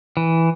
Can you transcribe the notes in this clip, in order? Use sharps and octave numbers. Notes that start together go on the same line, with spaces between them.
E3